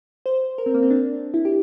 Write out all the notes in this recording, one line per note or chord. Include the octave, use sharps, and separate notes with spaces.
C5
A#4
C4
A#3
C4
D4
E4
G4